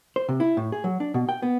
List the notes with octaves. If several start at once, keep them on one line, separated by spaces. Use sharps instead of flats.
C5
C3
E4
A2
G#4
F#3
D4
B2
G5
B3